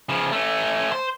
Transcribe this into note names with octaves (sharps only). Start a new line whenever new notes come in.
C#3 F3
A3 C#4
C5